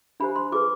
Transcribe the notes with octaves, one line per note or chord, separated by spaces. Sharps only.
D4 G4 C5 B5
C6
F4 G#4 B4 D6